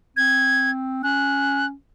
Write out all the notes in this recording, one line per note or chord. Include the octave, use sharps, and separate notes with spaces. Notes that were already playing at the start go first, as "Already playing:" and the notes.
C4 G#6
C#4 F#6